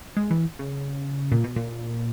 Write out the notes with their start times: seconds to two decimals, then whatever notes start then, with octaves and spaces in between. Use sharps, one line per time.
0.17 G#3
0.31 E3
0.59 C#3
1.32 A#2
1.44 B2
1.56 A#2